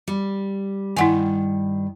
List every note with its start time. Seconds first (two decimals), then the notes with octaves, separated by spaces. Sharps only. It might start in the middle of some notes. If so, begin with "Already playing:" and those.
0.08 G3
0.97 G2 D#3 E4 F#5 G#5